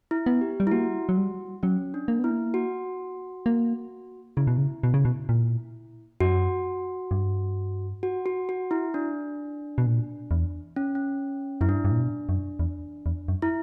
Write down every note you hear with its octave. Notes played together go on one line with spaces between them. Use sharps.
E4
B3
G4
G3
E4
A#3 F#4
F#3
G3
F#3 C#4
D4
A#3
B3 E4
A#3
F#4
A#3
C#3 E4
B2
C#3
B2
C#3
B2
A#2
F#2 F#4
G2
F#4
F#4
F#4
E4
D4
B2
A#2
E2
C#4
C#4
F#2 E4
G2 D4
G2
A#2
B2
F#2
E2
E2
F#2
E4